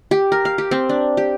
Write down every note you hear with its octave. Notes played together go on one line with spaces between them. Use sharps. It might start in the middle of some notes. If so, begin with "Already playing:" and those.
G4
A#4
F5
G4
C4
D4
G4